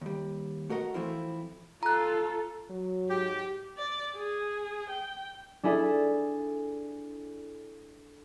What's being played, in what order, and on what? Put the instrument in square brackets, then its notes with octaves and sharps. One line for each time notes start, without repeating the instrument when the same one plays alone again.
[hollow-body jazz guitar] D#2 G3
A3 F#4 A#4 D#5 F#5
E3 F3 A3 C4 E4 F4
[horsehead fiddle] F4 A4 [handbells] A#5 F#6
[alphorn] F#3
[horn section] G#2 G4
[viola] D5
G#4
G5
[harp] D4 E4 G#4 A4 E5